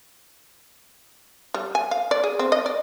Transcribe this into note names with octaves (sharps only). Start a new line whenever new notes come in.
G3
G#5
F5
D5
G#4
C4
D#5
D5